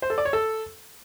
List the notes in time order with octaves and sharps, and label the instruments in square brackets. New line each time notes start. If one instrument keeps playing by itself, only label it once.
[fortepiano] C5
A4
D5
C#5
A4